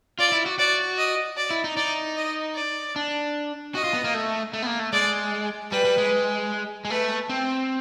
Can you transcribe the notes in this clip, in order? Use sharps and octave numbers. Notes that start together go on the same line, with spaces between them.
F4 D5
E4
F#4
F#4 D5
D#5
D5
E4
D#4
D#4 D5
D#5
D5
D4
F#4 D#5
F4
B3
A#3
A3
A3
B3
A#3
A3
G#3 D5
G3 B4
G3
G#3
G#3
A3 B4
C4